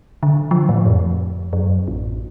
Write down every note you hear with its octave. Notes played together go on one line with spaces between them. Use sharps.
D3
F3
A2
F2
F#2
A1